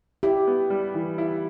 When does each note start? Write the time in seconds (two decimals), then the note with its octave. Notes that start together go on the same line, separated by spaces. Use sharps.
0.23 E4 G4
0.47 B3
0.70 G3
0.94 E3
1.18 E4